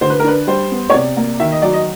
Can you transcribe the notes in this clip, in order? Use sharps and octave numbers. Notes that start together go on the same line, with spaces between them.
D3 C5
B4
A#4
D4 B4
G3 C5
B3
C#5
C3 D5
A#3
D#3 E5
D#5
F#3 D5
D#5